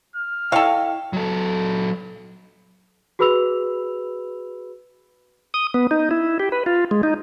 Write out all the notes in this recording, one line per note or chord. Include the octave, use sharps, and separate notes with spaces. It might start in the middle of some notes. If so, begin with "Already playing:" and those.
F6
E4 A4 C#5 D#5 F5 G5
F#3 A4
F#4 G#4 B4 B5 E6 F7
D#6
B3
D#4
E4
G4
B4
F4
G#3
D#4